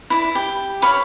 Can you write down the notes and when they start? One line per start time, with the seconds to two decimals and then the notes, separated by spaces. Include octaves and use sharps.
0.10 E4 D5
0.35 G4
0.82 C#5 F5 B5 D6